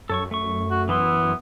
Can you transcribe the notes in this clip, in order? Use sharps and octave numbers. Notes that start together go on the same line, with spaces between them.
F#2 A4 C#5 C#6
A3 C#6
F#4
E3 B3 E4 C6